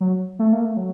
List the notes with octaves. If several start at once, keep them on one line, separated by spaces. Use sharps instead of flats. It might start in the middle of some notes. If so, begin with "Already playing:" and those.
F#3
A3
A#3
A3
F#3